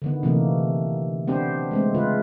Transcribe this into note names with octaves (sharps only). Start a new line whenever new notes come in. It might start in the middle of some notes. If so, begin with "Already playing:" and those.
D3 D#3 B3
C3 E3 A3 A#3
B3 C4 D4 G4 C5
G#3 A3 C4
C#3 F4 B4